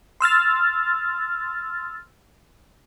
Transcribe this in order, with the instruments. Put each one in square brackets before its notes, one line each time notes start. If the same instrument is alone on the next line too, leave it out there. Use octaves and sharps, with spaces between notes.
[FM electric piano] C6 E6 F6 A6